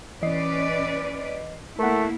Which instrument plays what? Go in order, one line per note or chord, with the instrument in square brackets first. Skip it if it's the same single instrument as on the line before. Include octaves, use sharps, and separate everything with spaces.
[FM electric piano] E3 D#5 C7 [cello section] C#4 B4 D5
[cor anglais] A3 [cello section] A#3 E4 [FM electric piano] A#4 F#5